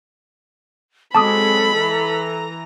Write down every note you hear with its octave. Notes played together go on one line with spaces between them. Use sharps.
F#3 G#3 C4 A4 A5 B5 D6 D#6
E3 A#5